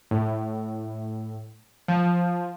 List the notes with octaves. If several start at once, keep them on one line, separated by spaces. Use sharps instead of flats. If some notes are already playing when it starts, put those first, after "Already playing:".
A2
F3